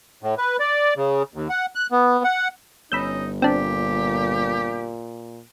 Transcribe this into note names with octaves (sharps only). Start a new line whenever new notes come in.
A2
B4
D5
C#3
D#2
F#5
F#6
B3
F#5
G1 C#4 D#4 B5 E6 G6
A#2 C4 D4 G4